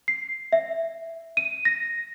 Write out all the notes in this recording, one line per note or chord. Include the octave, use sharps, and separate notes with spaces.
C7
E5
D#7
A#6